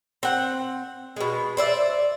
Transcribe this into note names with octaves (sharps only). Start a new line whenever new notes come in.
C4 F#5
B2 G#3
C5 D5 E5